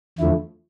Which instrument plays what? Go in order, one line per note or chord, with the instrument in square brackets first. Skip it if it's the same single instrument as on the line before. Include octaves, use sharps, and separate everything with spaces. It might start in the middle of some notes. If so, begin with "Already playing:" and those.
[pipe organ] E2 D3 F3 A3 E4